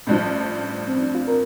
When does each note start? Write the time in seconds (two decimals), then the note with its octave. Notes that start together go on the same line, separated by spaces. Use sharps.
0.07 A1 G2 F3
0.87 C4
1.01 D4
1.15 F4
1.28 A#4